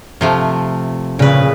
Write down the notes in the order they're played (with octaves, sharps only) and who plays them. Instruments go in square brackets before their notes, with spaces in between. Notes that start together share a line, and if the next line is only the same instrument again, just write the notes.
[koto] C3 F3 A3
[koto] A#2 B4 [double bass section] C#3